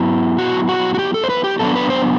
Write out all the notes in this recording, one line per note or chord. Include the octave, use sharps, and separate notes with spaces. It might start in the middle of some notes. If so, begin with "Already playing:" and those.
Already playing: F#3 B3 E4
F#4
F#4
F#4
G4
A4
C5
B4
G4
F#3 B3 D4 A4
B4
C5